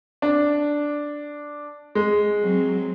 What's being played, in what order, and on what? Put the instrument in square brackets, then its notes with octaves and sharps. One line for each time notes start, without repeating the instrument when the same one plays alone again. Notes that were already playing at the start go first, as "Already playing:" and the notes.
[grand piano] D4
G#3
[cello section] F#3 C4